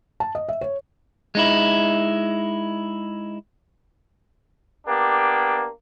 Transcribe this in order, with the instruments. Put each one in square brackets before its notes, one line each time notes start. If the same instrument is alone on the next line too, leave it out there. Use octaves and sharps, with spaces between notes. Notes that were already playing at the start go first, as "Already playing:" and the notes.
[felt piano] A5
D#5
E5
C#5
[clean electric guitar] G#3 D#4 E4
[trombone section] A#3 B3 D4 G4